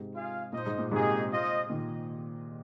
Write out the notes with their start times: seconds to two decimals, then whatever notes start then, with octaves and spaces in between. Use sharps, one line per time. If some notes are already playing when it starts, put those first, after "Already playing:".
Already playing: G#2 C3
0.14 F4 G#4 F5
0.53 A#2 D#4 C5 D#5
0.66 G#2
0.79 A#2
0.92 G#2 C3 A#3 D#4 G#4 D#5
1.31 F4 C5 D#5
1.70 A#2 D#3